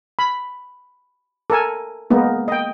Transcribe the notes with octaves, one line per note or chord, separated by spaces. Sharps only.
B5
A4 A#4 G#5
G#3 A#3 B3 D#4
D#5 G5